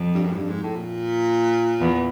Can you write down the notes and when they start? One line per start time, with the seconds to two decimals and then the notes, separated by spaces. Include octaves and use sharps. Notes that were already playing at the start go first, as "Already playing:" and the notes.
Already playing: F2
0.14 G2
0.24 F#2
0.31 G#2
0.36 G2
0.49 G#2
0.63 A2
0.75 A#2
1.80 E2